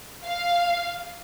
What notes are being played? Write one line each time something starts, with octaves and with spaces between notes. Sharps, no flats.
F5